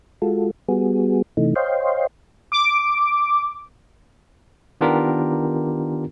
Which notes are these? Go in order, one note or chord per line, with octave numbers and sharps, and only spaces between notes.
G#3 F4 F#4 A4
G3 B3 F#4 G#4
C3 E3 A3 D#4
C5 C#5 D#5 F5 G5 C6
D6
D#3 B3 D4 F4 G4 A#4